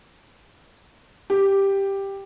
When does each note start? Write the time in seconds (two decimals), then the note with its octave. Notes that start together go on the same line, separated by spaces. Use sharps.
1.30 G4